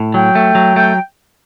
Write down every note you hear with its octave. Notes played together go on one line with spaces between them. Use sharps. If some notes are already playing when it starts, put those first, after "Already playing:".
Already playing: A2
F#3 G5
A3
F#3
A3 G5